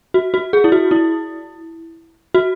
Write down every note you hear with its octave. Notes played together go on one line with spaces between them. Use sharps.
F#4
F#4
G#4
E4
F#4
E4
F#4